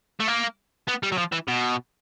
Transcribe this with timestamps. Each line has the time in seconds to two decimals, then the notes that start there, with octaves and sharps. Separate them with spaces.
0.20 A3
0.28 A#3
0.88 B3
1.03 G3
1.12 F#3
1.18 F3
1.32 E3
1.48 B2